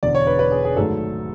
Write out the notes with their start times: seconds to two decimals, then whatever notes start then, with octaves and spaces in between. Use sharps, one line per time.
0.03 E1 E2 D3 D5
0.15 C#5
0.27 B4
0.39 B4
0.52 G#4
0.64 G#4
0.77 G#1 G#2 F#3 A3 A4